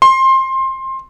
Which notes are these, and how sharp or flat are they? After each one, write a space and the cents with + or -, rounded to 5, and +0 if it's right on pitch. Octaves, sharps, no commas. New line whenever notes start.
C6 +20